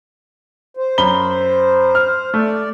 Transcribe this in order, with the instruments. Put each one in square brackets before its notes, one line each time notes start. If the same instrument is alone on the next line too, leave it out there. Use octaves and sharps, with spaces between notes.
[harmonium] C5
[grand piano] F#2 B5 G7
F6
[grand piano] A3 [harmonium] D5